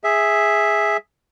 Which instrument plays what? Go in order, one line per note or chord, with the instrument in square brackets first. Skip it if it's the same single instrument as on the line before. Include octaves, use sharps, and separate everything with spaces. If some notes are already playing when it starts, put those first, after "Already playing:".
[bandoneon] G#4 E5